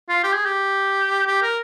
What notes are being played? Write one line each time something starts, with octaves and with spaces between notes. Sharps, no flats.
F4
G4
G#4
G4
G4
A#4